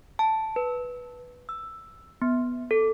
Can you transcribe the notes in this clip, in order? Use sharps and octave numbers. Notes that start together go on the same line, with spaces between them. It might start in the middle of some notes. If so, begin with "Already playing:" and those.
A5
B4
E6
B3
A4